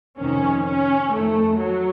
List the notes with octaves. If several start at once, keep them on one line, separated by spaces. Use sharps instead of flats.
F2 C3 D#3 C#4
C#4
F2 D#3 A3
F#3